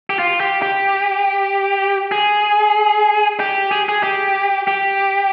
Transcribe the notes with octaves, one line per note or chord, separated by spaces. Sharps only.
G4
F4
G4
G4
G#4
G4
G#4
G#4
G4
G4